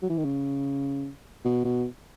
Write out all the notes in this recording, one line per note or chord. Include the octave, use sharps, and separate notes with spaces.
F#3
E3
D#3
C#3
B2
B2